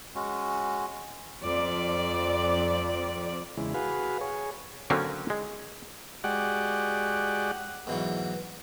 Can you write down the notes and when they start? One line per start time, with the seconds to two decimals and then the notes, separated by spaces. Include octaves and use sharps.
0.15 G#3 C#4 F#4
1.42 F2 D5
3.57 E2 C#3 G#3 E4
3.74 F#4 G#4 B4 F5
4.21 G#4 C#5
4.90 D3 F#3 A#3 C4 C#4
5.30 G#3
6.24 G#3 F#4 G4 D5 F#5
7.87 G#2 B2 E3 F#3